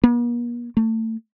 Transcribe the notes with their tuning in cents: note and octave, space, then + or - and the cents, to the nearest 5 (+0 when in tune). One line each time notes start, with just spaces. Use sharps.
A#3 +45
A3 +30